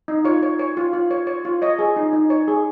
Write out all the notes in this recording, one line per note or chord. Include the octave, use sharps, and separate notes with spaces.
D#4
F4 C#5
C#5
C#5
F4
F4
C#5
C#5
F4
C#5 D#5
G#4
D#4
D#4
C#5
G#4